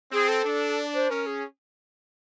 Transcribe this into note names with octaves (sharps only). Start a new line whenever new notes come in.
C4 G#4
A4
D4
C5
C#4 A#4
G#4